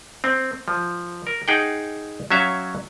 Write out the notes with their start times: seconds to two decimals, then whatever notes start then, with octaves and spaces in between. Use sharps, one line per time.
0.24 C4
0.68 F3
1.27 A#4
1.48 D#4 G#4 F#5 G5
2.31 F#3 C#4 E5 F5